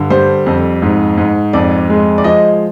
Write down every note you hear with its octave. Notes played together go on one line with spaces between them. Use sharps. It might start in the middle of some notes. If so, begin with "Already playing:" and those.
Already playing: G2 D3
G3 C5
F2
G#2
G#2
F2 D5
G#3
D5
F3 D#5